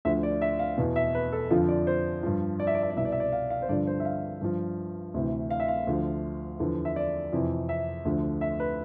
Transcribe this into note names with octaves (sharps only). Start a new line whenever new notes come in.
D2 D3 F3 E5
D5
E5
F5
E2 B2
E5
B4
A4
F2 D3 F3 F4
D5
C5
G2 F3
D5
E5
D5
E5
D5
C2 B2 E5
D5
E5
D5
F5
F5
C5
G2 D3 F3 D5
C5
E5
F5
G2 F3
D2 C3 E3
F5
E5
F5
D2 D3 F3
E2 D3 F3
E5
D5
F2 C3 E3
E5
D2 D3 F3
E5
B4